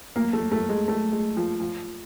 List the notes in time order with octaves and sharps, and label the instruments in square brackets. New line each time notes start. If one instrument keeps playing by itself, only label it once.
[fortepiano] A#3
A3
A3
G#3
A3
G#3
F3
F3